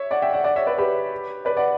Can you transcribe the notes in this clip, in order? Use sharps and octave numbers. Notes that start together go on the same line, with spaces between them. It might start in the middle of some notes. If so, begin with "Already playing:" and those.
Already playing: C#5 E5
D5 F#5
E5 G5
D5 F#5
D5 F#5
C#5 E5
B4 D5
G4 B4
B4 D5
D5 F#5